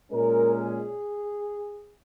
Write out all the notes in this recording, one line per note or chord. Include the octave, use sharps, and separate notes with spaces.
A#2 G#3 C#4 A#4
G#4